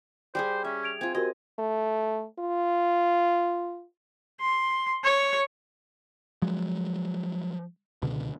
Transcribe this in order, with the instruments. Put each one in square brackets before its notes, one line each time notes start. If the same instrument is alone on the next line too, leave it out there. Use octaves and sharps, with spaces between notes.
[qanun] G3 G4 G#4 [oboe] C5
[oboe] C#4 [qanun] E5
[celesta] G#6 D7 F7
[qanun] C4 F4 [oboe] G#5
[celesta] F#4 G4 A#4 [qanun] D#5 [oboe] G#5
[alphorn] A3
F4
[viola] C6
C#5
[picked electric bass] F3 F#3 G#3
C#2 B2 D3